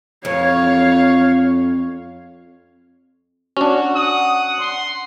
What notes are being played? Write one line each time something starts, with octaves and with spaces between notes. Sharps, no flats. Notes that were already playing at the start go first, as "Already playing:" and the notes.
F2 C#5 F5
C#4 D4 F#4
F#5 D#6
C6